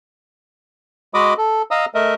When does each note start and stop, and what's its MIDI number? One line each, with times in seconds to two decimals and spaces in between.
1.14 1.34 56
1.14 1.34 66
1.14 1.34 75
1.14 1.34 83
1.14 1.34 86
1.14 1.34 87
1.38 1.62 69
1.71 1.86 75
1.71 1.86 77
1.71 1.86 82
1.71 1.86 87
1.71 1.86 88
1.94 2.14 57
1.94 2.14 70
1.94 2.14 75
1.94 2.14 76